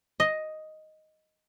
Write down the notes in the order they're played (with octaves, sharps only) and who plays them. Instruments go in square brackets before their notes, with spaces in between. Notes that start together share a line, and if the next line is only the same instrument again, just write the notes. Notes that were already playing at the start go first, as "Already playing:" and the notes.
[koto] D#5